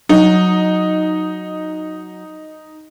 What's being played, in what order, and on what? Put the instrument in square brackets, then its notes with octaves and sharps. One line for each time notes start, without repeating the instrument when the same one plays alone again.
[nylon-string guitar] F#3 [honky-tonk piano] D#4